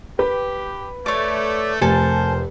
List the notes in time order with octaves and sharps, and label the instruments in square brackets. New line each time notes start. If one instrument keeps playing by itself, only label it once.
[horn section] G4 [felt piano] B4
[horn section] A3 [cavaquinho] C#5 D5
[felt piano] F1 [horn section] F3 A#4 C5 [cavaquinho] A4 G#5 A5